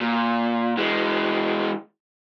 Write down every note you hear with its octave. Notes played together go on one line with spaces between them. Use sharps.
A#2
E3 G#3